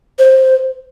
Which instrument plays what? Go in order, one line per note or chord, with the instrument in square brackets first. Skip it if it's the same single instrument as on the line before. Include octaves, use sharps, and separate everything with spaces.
[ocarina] C5